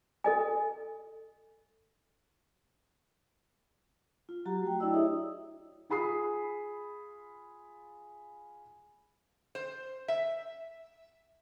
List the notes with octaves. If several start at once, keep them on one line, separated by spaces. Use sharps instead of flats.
A4 D#5 G#5
F4
F#3 F#4 G4 A#5
A3 F#4 G5
D4 E4 D5 D#5 E6
E4 G4 G#4 C#5 E5 D#6
F4 G#4 B5 D#6 C7
C5
E5